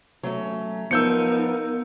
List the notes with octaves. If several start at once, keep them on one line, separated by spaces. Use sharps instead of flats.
F#3 A3 C#4
F3 B3 D#4 F4 A#4 E6 G6 C#7